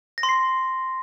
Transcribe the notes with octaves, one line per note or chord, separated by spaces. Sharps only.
A#6
C6
C7